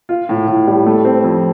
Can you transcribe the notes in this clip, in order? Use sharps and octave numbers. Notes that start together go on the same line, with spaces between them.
F4
A2
A2
G3
A3
C4
F2